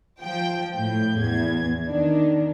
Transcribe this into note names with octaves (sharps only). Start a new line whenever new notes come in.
F3 G5
A2 G6
E2 G#6
D#3 D4